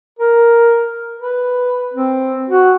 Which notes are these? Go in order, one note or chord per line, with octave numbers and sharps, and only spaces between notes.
A#4
B4
C4
F#4